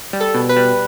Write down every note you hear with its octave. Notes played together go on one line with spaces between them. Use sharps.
G3
A4
B2
B4
G3